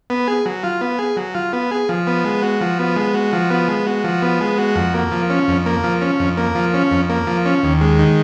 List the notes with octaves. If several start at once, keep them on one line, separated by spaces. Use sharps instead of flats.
B3
G#4
F#3
F4
B3
G#4
F#3
F4
B3
G#4
F3
B3
G#3
F#4
F3
B3
G#3
F#4
F3
B3
G#3
F#4
F3
B3
G#3
F#4
F2
A#3
F3
C#4
F2
A#3
F3
C#4
F2
A#3
F3
C#4
F2
A#3
F3
C#4
D#2
G#3
D#3